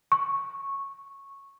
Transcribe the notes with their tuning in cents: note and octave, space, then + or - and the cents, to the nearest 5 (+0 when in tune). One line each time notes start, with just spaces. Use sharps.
C#6 -10